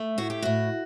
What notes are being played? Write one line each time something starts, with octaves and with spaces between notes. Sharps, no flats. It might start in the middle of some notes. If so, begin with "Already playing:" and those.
Already playing: A3
A2 F#4
G4
A2 F#4